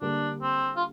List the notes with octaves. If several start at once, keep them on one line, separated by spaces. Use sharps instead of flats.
D3 G3 A#3 D4
C4
F4